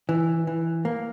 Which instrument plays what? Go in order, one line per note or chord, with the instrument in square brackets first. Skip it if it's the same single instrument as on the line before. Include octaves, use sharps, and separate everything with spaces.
[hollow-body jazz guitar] E3
E3
A#3